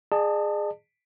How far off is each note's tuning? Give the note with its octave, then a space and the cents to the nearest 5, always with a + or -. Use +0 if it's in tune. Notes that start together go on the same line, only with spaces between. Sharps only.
G#4 -5 D5 +45 A5 +15